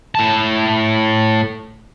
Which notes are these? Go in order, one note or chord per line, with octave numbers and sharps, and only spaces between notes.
A2 A5